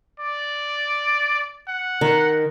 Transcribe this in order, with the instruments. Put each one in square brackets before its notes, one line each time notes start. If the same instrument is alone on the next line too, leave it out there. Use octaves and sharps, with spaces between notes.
[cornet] D5
F#5
[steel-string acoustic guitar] D#3